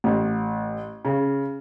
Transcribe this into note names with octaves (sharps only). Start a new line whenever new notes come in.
A1
C#3